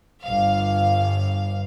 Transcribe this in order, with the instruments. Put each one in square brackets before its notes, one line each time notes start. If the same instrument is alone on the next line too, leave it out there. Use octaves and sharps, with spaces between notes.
[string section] G1 F5